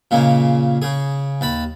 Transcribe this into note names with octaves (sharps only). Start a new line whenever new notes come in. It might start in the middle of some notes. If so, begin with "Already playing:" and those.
A#2 C#3 G#3 A#3
C#3 G#4
D#2 A5 B5